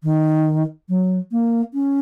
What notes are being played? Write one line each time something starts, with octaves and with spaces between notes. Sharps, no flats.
D#3
F#3
A#3
C#4